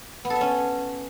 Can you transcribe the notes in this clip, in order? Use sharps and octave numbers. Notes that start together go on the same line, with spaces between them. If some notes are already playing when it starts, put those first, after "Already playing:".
B3
A4
E5
C#4